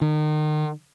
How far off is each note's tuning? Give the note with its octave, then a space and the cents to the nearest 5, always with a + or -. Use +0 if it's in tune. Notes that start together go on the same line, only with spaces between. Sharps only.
D#3 -35